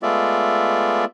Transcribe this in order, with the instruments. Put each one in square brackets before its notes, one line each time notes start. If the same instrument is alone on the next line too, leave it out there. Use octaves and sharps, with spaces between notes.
[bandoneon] G#3 A3 B3 F4 D5 E5